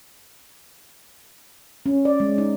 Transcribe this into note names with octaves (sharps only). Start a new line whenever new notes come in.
C#4
D5
G#3
D#4